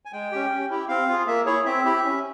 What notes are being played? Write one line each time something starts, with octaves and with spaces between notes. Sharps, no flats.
G#5
G#3 G5
C#4 G4
C#4
E4 G4
C4 F5
F4 G#4
A#3 E5
E4 G#4 C#5
C4 E5
E4 G4
C#4